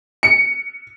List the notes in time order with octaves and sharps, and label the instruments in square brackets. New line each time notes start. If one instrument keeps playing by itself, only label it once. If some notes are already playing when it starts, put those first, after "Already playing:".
[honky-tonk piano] C#7